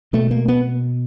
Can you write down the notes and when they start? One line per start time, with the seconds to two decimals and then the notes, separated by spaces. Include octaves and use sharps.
0.13 B2 A3
0.31 A#3
0.48 B3